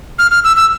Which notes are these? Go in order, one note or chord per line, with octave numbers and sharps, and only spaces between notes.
F6
F6
E6
E6